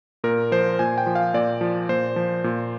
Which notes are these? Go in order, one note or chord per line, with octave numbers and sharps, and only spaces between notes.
A#2 A#4
F3 C5
A#2 G#5
G5
F3
F5
A#2 D5
F3
A#2 C5
F3
A#2